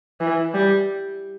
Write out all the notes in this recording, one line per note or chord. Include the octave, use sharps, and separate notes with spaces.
E3
G3